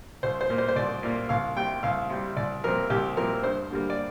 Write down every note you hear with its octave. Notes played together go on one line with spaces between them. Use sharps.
C2 C5
C5
A#2 A#3
C5
C5
C2 D5
A#2 A#3 D5
C2 F5
C3 G3 G5
C2 F5
C3 G3
C2 D5
A#2 F3 C4 A#4
C2 G4
A#2 F3 C4 A#4
G2 C5
D3 G3 A#3
D5